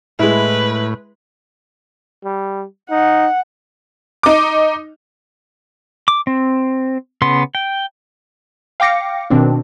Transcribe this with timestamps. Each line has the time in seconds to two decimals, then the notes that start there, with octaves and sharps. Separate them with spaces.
0.19 A2 G#3 E4 B4
2.24 G3
2.91 D#4 F#5
4.23 D#4 D6
6.08 D6
6.27 C4
7.22 C#3 B3 C6
7.55 G5
8.80 F5 G5 D6 A#6 C#7
9.30 B2 D#3 C4 D4